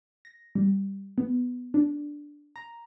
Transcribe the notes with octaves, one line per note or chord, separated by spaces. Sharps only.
A#6
G3
B3
D4
A#5